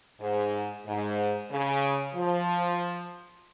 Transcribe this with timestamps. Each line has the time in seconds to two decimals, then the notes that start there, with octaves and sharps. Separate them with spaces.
0.20 G#2
0.86 G#2
1.50 C#3
2.14 F3